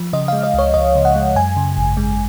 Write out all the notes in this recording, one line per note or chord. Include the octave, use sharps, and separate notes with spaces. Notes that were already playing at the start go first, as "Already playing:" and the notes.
Already playing: F3
C#3 D#5
G#3 F5
D#5
C#2 C#5
C#2 D#5
C#3
F#5
G#3
F#2 G#5
C#3
G#1
G#3